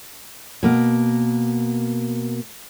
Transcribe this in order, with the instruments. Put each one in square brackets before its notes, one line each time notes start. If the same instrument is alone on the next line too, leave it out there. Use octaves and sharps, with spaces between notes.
[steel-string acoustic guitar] B2 A#3